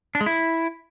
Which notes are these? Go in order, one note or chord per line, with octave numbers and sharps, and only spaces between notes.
D4
G#3
E4